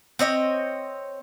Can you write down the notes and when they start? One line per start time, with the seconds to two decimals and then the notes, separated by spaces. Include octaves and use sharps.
0.19 C4 C#5 D#5 E5